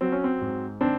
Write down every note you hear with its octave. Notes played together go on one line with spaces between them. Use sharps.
F#3 C4
C#4
C4
G#2
D#3 C4 D4